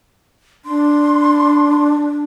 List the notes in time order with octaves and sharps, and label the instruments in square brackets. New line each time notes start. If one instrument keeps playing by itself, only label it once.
[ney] D4 [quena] C6